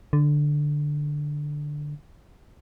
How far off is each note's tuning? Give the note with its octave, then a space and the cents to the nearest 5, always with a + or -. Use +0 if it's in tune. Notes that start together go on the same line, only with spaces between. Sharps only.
D3 +5